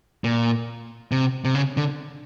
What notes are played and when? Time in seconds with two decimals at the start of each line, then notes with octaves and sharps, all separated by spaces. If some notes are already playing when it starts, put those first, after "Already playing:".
0.24 A#2
1.12 C3
1.45 C3
1.55 C#3
1.77 D3